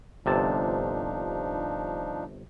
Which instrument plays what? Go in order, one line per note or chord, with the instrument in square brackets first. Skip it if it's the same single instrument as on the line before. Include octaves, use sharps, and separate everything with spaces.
[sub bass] D1 [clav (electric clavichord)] G1 C3 A5 [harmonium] F3 D4 D#4